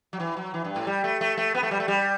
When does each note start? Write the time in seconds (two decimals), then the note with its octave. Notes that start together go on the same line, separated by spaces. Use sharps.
0.13 F#3
0.20 E3
0.37 F#3
0.54 E3
0.64 G2
0.76 A2
0.87 G3
1.04 A3
1.21 A3
1.37 A3
1.54 B3
1.63 A3
1.71 G3
1.80 A3
1.88 G3